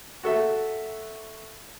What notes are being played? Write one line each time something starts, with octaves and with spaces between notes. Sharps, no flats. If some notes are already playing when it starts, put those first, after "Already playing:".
F#4 A4 E5